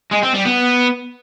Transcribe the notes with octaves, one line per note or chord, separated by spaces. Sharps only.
G#3
C4
G3
B3